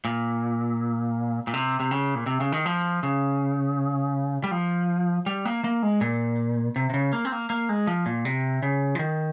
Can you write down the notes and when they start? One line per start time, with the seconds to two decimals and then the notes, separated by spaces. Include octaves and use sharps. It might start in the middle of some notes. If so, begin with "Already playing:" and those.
0.05 A#2
1.47 A#2
1.54 C3
1.80 C3
1.91 C#3
2.15 A#2
2.26 C3
2.40 C#3
2.52 D#3
2.66 F3
3.03 C#3
4.44 G3
4.51 F3
5.26 G3
5.45 A#3
5.64 A#3
5.83 G#3
6.01 A#2
6.76 C3
6.90 C3
6.94 C#3
7.13 A#3
7.25 C4
7.32 A#3
7.50 A#3
7.69 G#3
7.87 F3
8.06 A#2
8.25 C3
8.63 C#3
8.95 F3
8.99 D#3